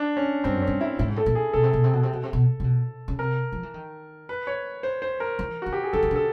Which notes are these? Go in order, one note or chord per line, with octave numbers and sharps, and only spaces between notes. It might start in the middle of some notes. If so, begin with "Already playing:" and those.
Already playing: D4
C#4
G2 C4
F#2
C#4
G2
E4
A2 E4
G#2
A2 A4
A#2
G#4
B2 A4
C3
B2
C3
B2
C3
B2
C3
B2
C3
B2
C#3
C3 A#4
F3
E3
D#3
B4
C#5
C5
C5
A#4
E3
D#3 F#4
G4
G#4
D3 A4
D#3
D3 A4